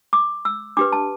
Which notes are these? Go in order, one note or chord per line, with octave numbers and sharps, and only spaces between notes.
D6
E6
D4 G4 B4 D6
A5